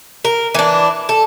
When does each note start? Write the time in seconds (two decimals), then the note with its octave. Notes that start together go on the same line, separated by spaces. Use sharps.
0.25 A#4
0.54 E3 D4
1.09 A4